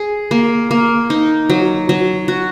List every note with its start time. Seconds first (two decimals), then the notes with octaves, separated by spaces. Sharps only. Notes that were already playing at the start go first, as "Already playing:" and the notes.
Already playing: G#4
0.31 A#3
0.71 A#3
1.10 D#4
1.50 F#3
1.89 F#3
2.28 F#4